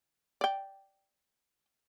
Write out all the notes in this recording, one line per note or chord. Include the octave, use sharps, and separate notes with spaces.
D5 G5